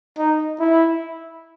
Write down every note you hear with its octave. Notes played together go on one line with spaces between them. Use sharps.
D#4
E4